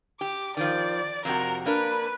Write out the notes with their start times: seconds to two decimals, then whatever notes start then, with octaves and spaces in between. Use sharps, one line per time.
0.21 G4 D6
0.57 D#3 F3 D5
1.25 F2 C3 F#4 A#4
1.66 A#3 D4 A#4 B4